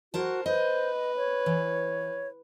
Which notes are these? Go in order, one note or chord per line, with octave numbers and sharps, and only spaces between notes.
F#4 A#4 C5 A5
B4 C5 D#5
C#5
E3